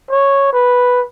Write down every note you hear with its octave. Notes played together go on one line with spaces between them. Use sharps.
C#5
B4